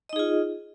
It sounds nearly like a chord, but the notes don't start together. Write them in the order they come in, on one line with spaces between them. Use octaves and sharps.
D#5 D#4 G#4 F4